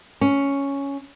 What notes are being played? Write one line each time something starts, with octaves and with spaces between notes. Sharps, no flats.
C#4